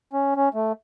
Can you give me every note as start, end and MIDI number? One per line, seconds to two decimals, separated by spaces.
0.13 0.34 61
0.36 0.49 61
0.54 0.72 57